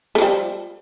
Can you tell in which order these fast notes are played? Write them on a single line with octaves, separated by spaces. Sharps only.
A3 F3 G3